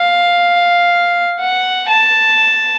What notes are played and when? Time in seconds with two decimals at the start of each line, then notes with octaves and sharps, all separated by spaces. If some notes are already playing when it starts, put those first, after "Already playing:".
Already playing: F5
1.38 F#5
1.88 A5